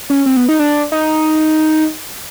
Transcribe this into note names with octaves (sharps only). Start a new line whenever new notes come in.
C#4
C4
B3
D#4
D4
D#4